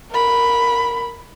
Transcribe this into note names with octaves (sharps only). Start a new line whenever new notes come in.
A#4 B5